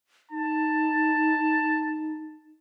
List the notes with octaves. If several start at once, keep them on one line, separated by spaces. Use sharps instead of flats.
D#4 A5